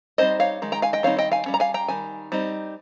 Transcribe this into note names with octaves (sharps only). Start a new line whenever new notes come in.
G3 C4 D#4 C5 D#5
C#5 F5
D#3 G#3
G5 A#5
F5 G#5
D#5 G5
D#3 G3 C4 D#4 C#5 F5
D#5 G5
F5 G#5
G3 C#4
A#5
F5 G#5
G5 A#5
D#3 G3 G#5
G3 C4 D#4